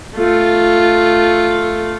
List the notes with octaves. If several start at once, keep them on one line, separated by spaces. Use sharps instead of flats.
A3 F4